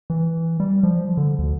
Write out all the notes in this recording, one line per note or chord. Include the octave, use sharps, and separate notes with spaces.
E3
G3
F3
D3
D2